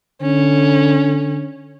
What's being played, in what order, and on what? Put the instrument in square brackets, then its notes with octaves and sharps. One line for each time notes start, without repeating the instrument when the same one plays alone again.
[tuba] D3 [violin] C#4